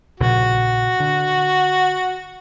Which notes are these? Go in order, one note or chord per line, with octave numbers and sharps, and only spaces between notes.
A#1 C#3 F#4
D3